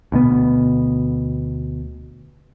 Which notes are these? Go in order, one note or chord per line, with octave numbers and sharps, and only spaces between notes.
D2 B2 B3